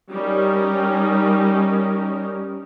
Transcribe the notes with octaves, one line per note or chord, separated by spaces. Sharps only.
G3 C#4 D#4 A#4